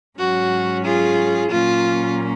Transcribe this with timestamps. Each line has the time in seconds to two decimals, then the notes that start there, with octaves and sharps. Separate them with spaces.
0.18 G#2 F#3 C#4 F#4
0.84 F4 G#4
1.50 A#2 F#3 A#3 C#4 F4